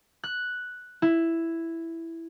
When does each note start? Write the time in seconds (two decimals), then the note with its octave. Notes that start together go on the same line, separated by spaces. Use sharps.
0.24 F#6
1.02 E4